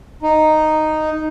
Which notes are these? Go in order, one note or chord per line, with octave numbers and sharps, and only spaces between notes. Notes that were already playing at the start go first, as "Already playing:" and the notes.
D#4